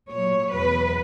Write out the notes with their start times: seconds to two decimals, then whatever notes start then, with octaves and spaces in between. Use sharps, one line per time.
0.10 A#2 F#3 C#5
0.53 E2 B2 F#3 B4